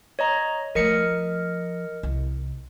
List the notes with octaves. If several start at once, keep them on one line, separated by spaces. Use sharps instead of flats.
C#5 D#5 A#5
F3 A3 A#4 D#5 C#7
C2